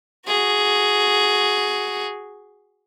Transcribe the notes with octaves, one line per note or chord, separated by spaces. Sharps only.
F#4 G#4